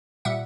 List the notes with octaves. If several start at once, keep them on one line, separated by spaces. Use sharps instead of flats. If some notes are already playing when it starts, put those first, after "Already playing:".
A#2 G3 E5 F#5